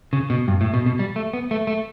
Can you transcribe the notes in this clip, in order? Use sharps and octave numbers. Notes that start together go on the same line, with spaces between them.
C#3
B2
G2
A2
B2
B2
G3
A3
B3
A3
A3